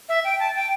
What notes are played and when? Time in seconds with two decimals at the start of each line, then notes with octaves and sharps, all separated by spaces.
0.09 E5
0.24 G5
0.40 A5
0.55 G5